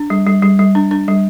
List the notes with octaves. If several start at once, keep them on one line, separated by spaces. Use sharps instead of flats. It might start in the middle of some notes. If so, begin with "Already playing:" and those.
Already playing: D4
G3
G3
G3
G3
D4
D4
G3